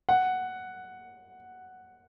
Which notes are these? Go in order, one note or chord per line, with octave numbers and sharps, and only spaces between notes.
F#5